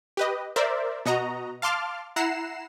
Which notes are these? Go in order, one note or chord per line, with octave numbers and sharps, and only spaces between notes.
G4 B4 D#5
A#4 C5 D5 E5
B2 F#4 D#5 A#5
F5 A5 C6 D6 F6
E4 F#5 A#5 C7 E7